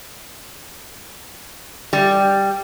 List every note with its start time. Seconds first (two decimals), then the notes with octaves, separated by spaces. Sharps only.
1.93 G3